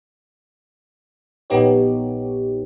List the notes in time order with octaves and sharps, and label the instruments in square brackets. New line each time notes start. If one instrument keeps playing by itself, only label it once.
[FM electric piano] A#1 B3 D#4 G4 C#5